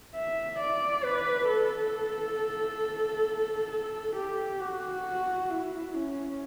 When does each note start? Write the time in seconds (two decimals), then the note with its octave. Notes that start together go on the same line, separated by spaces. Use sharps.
0.15 E5
0.60 D5
1.04 B4
1.49 A4
3.72 A4
4.17 G4
4.61 F#4
5.51 E4
5.95 C#4